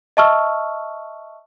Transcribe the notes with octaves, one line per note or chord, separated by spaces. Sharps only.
D#5 E5 A5 C#6 E6 F6